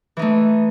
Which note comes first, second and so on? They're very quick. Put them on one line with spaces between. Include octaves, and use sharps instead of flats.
E3 D#4 A3